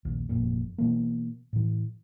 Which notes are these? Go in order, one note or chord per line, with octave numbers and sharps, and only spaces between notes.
A#1 D#2
G1 F2 A#2
B2 E3 A#3
A2 E3